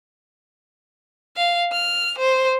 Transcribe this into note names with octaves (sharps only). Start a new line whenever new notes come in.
F5
F6
C5